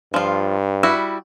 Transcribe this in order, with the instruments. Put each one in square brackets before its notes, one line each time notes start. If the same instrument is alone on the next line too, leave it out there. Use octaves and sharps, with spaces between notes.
[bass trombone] G2 [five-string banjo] F3 F4
[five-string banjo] G3 E4 F#4